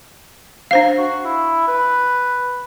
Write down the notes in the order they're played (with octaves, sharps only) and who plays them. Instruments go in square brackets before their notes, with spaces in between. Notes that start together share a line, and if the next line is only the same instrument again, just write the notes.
[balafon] D4 C5 F5
[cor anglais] F#4
E4
B4